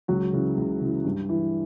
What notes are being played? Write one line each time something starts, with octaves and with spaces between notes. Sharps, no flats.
C#2 F#3 F#4
C#3 E3
C#2
C#3 E3
G2
E3